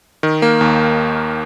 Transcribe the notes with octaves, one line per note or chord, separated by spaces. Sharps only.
D#3
A#3
D#2